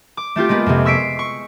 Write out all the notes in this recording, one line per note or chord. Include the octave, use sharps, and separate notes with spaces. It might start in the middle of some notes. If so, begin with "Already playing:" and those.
D6
A3 C4 F4 G4
G#3 A#3 B3 F4
F2 C3
C#6 E6 B6 C7 D7
C#6